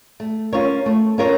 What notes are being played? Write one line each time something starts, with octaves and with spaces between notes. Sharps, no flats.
A3
C#4 F4 A#4 C#5
A3
C#4 F4 A#4 C#5